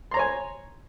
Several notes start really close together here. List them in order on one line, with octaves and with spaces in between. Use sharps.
C6 A#5 C#5 G#5